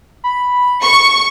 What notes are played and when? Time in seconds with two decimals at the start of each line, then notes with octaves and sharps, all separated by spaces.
0.24 B5
0.83 C#6